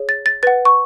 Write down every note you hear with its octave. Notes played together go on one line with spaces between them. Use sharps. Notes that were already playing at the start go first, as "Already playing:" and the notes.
Already playing: G#4 C#5
A6
A6
B4 F#5 A6
C#6